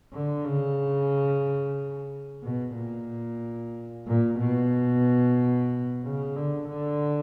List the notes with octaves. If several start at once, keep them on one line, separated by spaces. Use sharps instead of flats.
D3
C#3
B2
A#2
A#2
B2
C#3
D3
D3